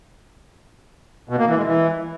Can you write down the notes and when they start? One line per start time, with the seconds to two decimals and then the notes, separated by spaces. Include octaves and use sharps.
1.29 B2
1.38 A#3
1.48 E3
1.57 G#3
1.66 E3